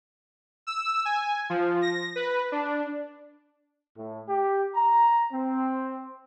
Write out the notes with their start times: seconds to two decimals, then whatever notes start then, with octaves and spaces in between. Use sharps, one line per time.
0.67 E6
1.05 G#5
1.50 F3
1.82 A#6
2.16 B4
2.52 D4
3.96 A2
4.28 G4
4.74 A#5
5.32 C4